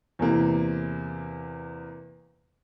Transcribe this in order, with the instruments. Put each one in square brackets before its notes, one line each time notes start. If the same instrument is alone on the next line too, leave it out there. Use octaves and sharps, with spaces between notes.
[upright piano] E2 C3 A#3